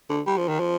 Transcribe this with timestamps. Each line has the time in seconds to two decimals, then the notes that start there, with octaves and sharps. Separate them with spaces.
0.09 D3
0.26 G3
0.37 F3
0.49 D#3
0.60 F3